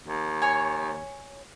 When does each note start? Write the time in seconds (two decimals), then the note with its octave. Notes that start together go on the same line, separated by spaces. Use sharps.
0.07 D#2
0.42 C#5 G#5